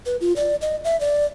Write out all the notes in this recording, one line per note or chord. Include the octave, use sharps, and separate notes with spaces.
B4
F4
D5
D#5
E5
D5